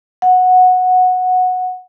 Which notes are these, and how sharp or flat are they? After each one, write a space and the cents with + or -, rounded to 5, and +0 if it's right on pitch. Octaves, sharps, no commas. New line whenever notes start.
F#5 -10